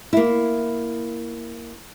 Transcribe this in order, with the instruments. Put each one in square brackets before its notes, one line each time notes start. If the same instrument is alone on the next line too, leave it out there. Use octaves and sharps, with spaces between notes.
[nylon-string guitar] A#3 E4